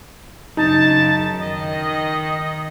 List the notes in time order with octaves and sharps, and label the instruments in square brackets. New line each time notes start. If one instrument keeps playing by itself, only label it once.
[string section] F#2 C#3 [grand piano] D#4 [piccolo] A5
[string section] D#3 [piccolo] D#5